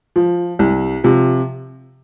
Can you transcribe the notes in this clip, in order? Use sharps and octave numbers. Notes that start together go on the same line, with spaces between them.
F3
C2
C3 F3